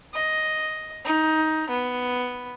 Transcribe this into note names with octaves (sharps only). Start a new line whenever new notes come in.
D#5
D#4
B3